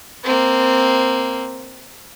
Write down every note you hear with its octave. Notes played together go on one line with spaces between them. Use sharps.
A#3 C4